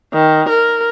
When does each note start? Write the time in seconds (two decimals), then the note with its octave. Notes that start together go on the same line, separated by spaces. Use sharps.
0.14 D#3
0.49 A#4